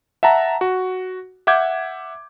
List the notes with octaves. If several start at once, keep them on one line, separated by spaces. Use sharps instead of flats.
E5 F#5 A5 A#5
F#4
E5 F#5 D6 G6 G#6